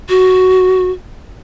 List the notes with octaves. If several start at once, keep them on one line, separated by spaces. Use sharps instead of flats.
F#4